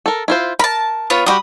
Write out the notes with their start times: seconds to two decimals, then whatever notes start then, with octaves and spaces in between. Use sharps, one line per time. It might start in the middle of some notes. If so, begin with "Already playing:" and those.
0.06 A4 A#4
0.28 E4 F4 C5
0.59 A#4 A5 B5
1.10 B3 F4 C#5
1.26 G3 F#4 G4 B5 D#6